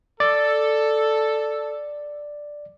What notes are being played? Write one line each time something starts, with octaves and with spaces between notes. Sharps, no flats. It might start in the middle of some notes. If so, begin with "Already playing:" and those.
A4 D5